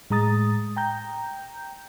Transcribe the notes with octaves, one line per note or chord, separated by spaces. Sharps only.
A2 G#3 A#5 D#6 A6
G5 A#5 G6